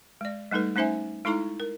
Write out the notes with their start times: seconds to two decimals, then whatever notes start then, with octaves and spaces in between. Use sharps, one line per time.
0.21 G#3 D5
0.51 G3 A3 D#4 A4 B4
0.76 A3 C#4 D#4 C5 E5 G#5
1.25 G#3 D#4 E4 A4 A#5 C#6
1.60 A#4